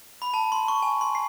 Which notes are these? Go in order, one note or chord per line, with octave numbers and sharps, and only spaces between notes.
B5
A5
C6
C#6
G#5
C6
C7